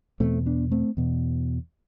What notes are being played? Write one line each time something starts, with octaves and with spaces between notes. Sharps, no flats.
E2 B2 A3 C4
B3 D4
A3 C4
E2 B2